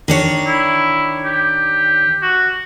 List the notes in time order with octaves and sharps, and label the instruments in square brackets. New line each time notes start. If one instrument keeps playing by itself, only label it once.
[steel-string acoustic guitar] D#3 D4 C#5
[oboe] E4
G4
F#4